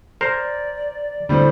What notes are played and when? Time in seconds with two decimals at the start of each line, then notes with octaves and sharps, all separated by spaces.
0.21 A#4 C5 D5
1.29 A2 D3 G3 C4